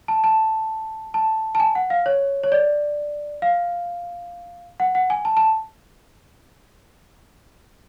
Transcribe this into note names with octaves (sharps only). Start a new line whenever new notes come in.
A5
A5
A5
A5
G#5
F#5
F5
C#5
C#5
D5
F5
F#5
F#5
G#5
A5
A5